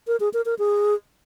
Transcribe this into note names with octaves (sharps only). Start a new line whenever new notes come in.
A#4
G#4
A#4
A#4
G#4